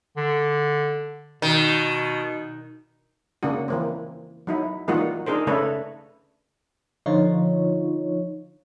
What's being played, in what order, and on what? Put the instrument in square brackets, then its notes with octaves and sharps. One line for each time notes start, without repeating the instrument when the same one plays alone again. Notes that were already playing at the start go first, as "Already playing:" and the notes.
[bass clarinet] D3
[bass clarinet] B2 [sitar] D#3
[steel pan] C#3 A#3 D4 F#4
E3 A#3 C4
F#3 D#4 E4
E3 G3 A#3 D#4 F4 F#4
D4 D#4 G#4 A#4 C5
C#3 A3 D4 A4 B4 C#5
[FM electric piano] D3 F3 D#4 F4 C#5